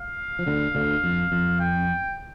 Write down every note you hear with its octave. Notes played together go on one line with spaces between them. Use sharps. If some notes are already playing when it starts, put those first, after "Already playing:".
Already playing: F5
F3
D2 D3
D2 D3
F2
F2
G5